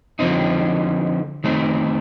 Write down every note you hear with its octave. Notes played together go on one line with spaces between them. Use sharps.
D3 F3 C4 D#4
D#3 A3 C4